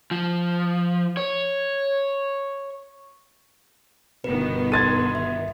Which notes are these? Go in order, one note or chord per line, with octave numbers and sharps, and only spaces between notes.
F3
C#5
G1 B2 D#3 B3 B4
A4 C6 G#6 A6 D#7
E5